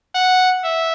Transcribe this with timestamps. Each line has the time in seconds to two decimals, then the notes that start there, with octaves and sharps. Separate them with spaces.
0.15 F#5
0.64 E5